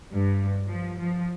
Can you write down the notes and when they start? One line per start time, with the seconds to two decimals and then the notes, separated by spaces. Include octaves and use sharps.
0.13 G2
0.67 F3
1.00 F3